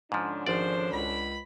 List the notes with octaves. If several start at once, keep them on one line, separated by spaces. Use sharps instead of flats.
G#2 D3 F3 C#4 D4
G#1 F3 C5 D5
C#2 B5